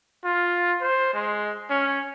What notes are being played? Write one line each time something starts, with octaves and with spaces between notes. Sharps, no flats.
F4
C5
G#3
C#4